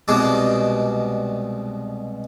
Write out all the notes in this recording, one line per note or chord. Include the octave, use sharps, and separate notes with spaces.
C2 B2 G#3 D5